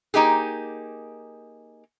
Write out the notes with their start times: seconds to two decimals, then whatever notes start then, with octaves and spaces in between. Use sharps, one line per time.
0.14 A#3 D#4 G4 G#4